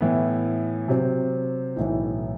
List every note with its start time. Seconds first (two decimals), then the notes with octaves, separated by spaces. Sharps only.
0.01 A2 E3 B3
0.88 C3 F#3 C4
1.76 B1 A2 E3